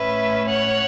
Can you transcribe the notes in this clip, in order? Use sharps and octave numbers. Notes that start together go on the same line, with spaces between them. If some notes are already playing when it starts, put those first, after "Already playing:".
Already playing: A2 A3 C#4 B4 E5
C#5 F#5